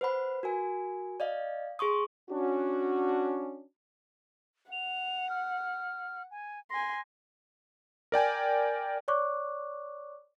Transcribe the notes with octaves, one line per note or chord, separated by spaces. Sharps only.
B4 C5 F#5 B5
F#4 A#4 G#5
D5 D#5 F5
G#4 C6 C#6 D#6
C#4 D4 F#4
F#5 F7
F6
G#5
G#5 C6 A#6
A#4 D5 G5 G#5
C#5 D5 C#6 D6 F#6